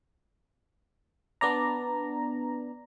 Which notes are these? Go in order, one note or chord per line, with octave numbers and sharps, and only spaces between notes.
B3 D4 D5 A#5